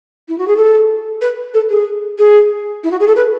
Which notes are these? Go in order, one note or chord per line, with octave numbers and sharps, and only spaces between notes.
E4
F#4
G#4
A4
B4
A4
G#4
G#4
E4
F#4
G#4
A4
B4